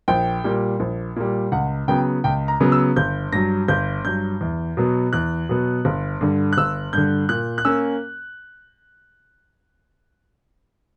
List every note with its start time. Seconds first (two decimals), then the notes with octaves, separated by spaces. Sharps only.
0.08 A#1 G5
0.44 A#2 G3
0.80 A#1
1.16 A#2 G3
1.52 C#2 F#5
1.88 C#3 F#3 B3 G5
2.24 C#2 G5
2.48 A#5
2.60 C#3 F#3 B3
2.72 E6
2.96 G1 G6
3.32 G2 F#3 A#6
3.68 G1 G6
4.05 G2 F#3 G6
4.41 E2
4.77 B2 F#3 B3
5.13 E2 F#6
5.49 B2 F#3 B3
5.85 G1
6.21 G2 D3
6.53 F#6
6.57 G1 E6
6.93 G2 D3 G6
7.29 A#2 F#6
7.58 F#6
7.65 A#3 C#4 E6